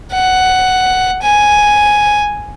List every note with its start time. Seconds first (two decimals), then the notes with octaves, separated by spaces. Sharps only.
0.13 F#5
1.22 G#5